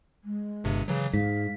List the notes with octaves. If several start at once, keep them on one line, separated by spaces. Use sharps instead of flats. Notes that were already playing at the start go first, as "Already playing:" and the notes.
G#3
G1 G2 C3
C#3 E3 F#3
G#2 F5 B6